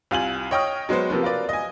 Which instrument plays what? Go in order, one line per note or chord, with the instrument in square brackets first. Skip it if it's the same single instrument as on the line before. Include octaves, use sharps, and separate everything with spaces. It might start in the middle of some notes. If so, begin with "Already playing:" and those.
[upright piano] C2 F4 G#5 F#7
C#5 D#5 G5 C#6 D#6 F6
F#3 G#3 B3 F#4 C5
C3 F3 A#3 B3
F4 A#4 B4 D5
D#5 G#5